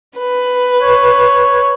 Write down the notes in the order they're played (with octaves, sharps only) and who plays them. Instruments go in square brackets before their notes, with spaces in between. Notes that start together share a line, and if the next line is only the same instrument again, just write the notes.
[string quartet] B4
[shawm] C#5